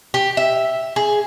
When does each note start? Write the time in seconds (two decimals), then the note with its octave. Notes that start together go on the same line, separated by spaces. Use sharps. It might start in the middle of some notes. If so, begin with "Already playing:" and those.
0.14 G4
0.37 E5
0.96 G#4